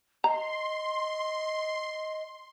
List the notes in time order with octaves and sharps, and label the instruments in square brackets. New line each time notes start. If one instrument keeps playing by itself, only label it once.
[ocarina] D#5 [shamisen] A#5 [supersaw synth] C6